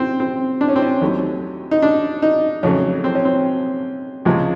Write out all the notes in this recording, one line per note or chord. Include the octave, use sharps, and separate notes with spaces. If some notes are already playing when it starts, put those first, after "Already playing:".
Already playing: C4
C4
D4
C#4
C4
C#4
D#2 D#3 F#3 A3
D#4
D4
D#4
F2 C#3 F#3 A3 C#4
C4
C#4
C4
C#2 C3 F3 G#3